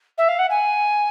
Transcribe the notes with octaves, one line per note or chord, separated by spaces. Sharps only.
E5
F5
F#5
G#5